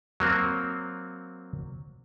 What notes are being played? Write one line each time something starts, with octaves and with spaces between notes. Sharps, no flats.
F#3 A#3 C4